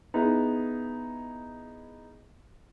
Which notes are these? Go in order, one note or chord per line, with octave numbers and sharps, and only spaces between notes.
B3 D#4 E4 G#4